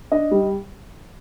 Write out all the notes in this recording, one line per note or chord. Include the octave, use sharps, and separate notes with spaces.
D4 D#5
G3